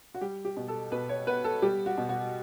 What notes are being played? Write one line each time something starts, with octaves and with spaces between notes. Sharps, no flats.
F#4
G3 G4
G4
B2
A4
B2 B4
C#5
B3 B4
A4
G3 G4
F#4
B2
F#4